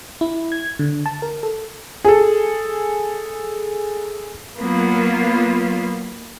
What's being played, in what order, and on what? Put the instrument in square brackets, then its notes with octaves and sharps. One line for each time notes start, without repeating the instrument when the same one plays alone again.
[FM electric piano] E4
G#6
D3
A5
A#4
A4
[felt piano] G#4 A4
[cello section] F#3 A#3 B3 F4